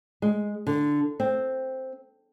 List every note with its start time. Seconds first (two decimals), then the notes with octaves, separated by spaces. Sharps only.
0.22 G#3
0.67 D3
1.20 C4